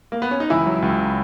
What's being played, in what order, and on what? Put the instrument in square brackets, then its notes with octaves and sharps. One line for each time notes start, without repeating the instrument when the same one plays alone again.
[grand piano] A#3
B3
C#4
D#4
[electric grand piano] C#2 [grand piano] E3 E4
[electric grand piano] F#3
C#2